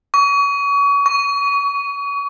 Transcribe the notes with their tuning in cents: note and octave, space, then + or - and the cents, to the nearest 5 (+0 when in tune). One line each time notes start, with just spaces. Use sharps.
C#6 +35
C#6 +20